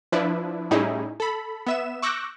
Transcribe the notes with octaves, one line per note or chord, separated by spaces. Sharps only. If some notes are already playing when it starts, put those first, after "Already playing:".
F3 D4 E4 B4
A2 G3 C#4 D#4 E4 G#4
A4 B5
B3 E5 E7
C#6 D6 E6 F#6 G6 A#6